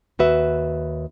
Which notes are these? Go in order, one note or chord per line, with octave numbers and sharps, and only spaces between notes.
D#2 F#4 B4 E5